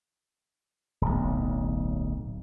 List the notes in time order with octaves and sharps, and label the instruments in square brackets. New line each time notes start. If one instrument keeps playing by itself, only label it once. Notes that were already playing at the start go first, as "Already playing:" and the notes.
[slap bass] D1 B1